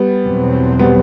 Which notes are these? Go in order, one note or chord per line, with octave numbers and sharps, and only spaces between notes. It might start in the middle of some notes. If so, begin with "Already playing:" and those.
Already playing: G3 B3
E2 B2 F#3 C4
G3 B3